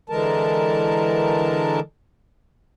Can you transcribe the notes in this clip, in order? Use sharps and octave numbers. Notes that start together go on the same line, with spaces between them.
D3 E3 G#3 A#4 A5